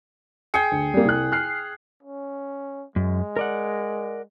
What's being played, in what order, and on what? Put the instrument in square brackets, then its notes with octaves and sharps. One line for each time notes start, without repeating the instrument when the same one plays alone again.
[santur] G#4 G5 [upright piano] C#7
[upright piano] D2
G3 A#3
C2 F#6
F6 F#6 C7
[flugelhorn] C#4
[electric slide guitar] F#2 [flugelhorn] G#3
[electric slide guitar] A#4 D5 F#5